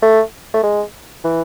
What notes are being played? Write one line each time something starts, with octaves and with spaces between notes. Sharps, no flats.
A3
A3
G#3
E3